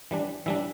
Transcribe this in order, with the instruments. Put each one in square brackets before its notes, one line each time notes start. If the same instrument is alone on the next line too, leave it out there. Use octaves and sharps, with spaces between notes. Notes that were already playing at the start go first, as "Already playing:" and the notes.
[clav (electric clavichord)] E3 G3 D4
E3 G3 D4 E5